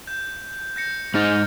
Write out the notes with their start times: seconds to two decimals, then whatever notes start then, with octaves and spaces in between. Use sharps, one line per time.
0.07 G6
0.76 G6 A#6 C#7
1.14 G#2 D#4 F6 A6